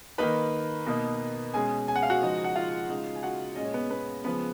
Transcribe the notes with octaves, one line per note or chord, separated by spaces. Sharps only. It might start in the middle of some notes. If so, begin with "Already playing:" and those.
D#3 A#3 D#4 B4 B5
B2 A#3 D#4
B2 G#3 C#4 G#4 G#5
G#5
F#5
F5
F#4 F#5
C#3 F3 G#3 D#4
F#5
F4 F5
C#3 G#3 D#4
G#5
F#4 F#5
A#2 G#3 C#4 D#5
C#5
B3 B4
B3 B4
C#3 F3 G#3 B3 B4